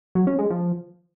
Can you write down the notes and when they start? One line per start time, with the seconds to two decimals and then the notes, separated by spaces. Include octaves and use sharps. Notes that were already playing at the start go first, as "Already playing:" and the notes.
0.15 F#3
0.27 C#4
0.39 G#3
0.50 F3